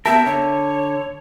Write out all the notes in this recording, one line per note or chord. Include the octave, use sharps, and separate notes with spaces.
B3 G4 A#4 E5 A5
D3 C#5